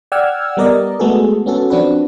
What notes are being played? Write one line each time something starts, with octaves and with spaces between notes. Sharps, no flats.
D5 F#5 G5 E6 F6 G#6
G3 B3 A#4 D5 D#5
G#3 A3 B3 F#4 G#4 A4
B3 C#4 F#4 A4
F3 C4 D4 F#4 B4